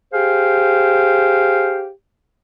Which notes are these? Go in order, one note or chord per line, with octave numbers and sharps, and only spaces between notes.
G4 G#4 C5 F5